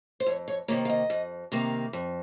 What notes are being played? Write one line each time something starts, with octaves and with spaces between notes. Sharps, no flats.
C5
F2 C#5
C#5
C3 D#3 A#3 C#5
F5
D#5
F2
C3 D#3 A#3
F2